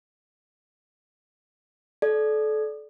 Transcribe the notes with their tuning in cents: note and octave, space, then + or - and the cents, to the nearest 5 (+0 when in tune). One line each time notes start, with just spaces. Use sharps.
A4 -30 D5 +0